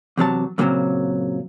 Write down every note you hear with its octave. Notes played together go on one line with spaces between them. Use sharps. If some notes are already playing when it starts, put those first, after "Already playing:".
E2 C3 F#3 A5
F#2 A#2 C#3 F3 F#3 C4